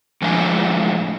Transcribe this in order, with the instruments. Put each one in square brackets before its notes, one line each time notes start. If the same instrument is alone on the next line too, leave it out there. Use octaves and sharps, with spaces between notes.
[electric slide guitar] A2 F3 G#3 D4 F5 G#5